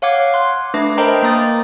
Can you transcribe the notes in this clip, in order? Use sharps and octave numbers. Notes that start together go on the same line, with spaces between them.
C#5 F5 F#5 D6 G#6
C6 F#6
A3 D4 B4 D6 A#6
A#4 C5 D#5 G5 A#5 B5
A#3 A#5 D#6 A6